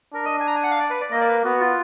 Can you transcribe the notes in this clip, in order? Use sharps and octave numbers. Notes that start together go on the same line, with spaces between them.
D4 A#4
D#5
G#5
A#5
G#5
F#5
F5
D5
B4
D5
A#3 D#5
D5
B4
B3 F#4
F4